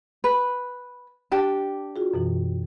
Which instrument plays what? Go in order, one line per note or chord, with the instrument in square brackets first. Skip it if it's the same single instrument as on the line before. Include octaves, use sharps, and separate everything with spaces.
[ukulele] B4
D4 G4 A5
[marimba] F4 F#4 G#4
F#2 B2 E3